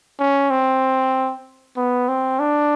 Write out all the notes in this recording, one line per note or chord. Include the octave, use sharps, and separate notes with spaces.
C#4
C4
B3
C4
D4